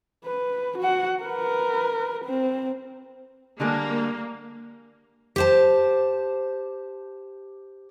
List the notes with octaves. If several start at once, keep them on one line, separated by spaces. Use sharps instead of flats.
B4
F#4 F#5
A#4 B4
C4
D3 G3 G#3 A#3
G4 C5 A5